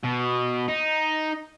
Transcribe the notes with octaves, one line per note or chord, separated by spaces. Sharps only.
B2
D#4